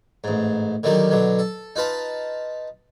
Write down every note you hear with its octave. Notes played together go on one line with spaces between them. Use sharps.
A1 G#2
D3 D#3 F#3 G3 A#3
B2 D3 F#3
A4
D#4 F4 B4 A5